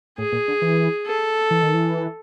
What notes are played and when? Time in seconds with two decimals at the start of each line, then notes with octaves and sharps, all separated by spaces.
0.18 A2 G#4
0.32 A#2
0.48 D3
0.62 E3
1.06 A4
1.51 E3
1.63 D#3
1.74 E3